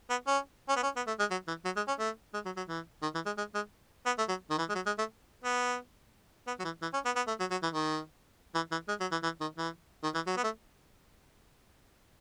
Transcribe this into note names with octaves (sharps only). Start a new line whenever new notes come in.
B3
C#4
C#4
B3
C#4
B3
A3
G#3
F#3
E3
F#3
G#3
C#4
A3
G#3
F#3
F#3
E3
D#3
E3
G#3
G#3
G#3
B3
A3
F#3
D#3
E3
G#3
F#3
G#3
A3
B3
B3
F#3
E3
E3
C#4
B3
B3
A3
F#3
F#3
E3
D#3
E3
E3
G#3
F#3
E3
E3
D#3
E3
D#3
E3
F#3
B3
A3